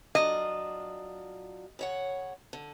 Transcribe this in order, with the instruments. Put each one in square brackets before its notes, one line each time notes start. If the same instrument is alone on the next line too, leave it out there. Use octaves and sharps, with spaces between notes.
[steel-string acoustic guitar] F#3 D4 F4 [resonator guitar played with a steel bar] D#5
[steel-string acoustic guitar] C#3 C#5 F#5
D3